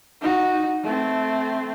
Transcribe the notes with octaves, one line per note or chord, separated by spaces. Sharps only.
D#4 F#4
A3 C4